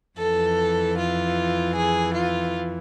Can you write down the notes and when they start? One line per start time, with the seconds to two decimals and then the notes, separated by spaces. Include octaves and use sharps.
0.19 F2 E3 A4
0.98 F4
1.76 G#4
2.14 F4